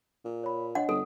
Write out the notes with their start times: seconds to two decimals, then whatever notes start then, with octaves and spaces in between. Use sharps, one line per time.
0.25 A#2
0.43 C#5 B5
0.75 D4 C#5 D#5 F#5
0.89 G1 A4